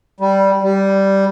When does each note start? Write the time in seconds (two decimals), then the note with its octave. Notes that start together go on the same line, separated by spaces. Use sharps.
0.20 G3
0.63 G3